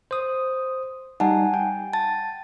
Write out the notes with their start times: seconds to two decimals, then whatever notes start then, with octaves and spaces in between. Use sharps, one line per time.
0.11 C5 D#6
1.20 G3 D#4 F#5 G#5 A5
1.54 G5
1.93 A5 A6